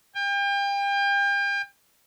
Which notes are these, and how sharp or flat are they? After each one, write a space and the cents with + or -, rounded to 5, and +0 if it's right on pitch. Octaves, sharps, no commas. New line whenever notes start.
G5 +35